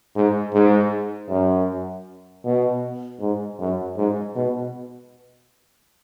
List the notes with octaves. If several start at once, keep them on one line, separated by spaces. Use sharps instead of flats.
G#2
G#2
F#2
B2
G#2
F#2
G#2
B2